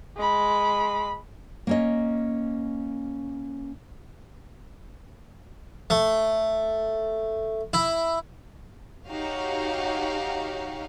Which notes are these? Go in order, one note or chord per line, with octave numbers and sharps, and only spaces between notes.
G#3 B5
A#3 C#4 D#5
A3
E4
D#4 F#4 G4 C#5 F5